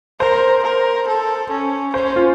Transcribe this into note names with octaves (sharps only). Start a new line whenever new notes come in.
A#4 C5
A#4
A4
C#4
C#4 C5
F4